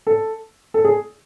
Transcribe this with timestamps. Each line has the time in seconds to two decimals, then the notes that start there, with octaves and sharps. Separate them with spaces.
0.07 A4
0.74 A4
0.84 G#4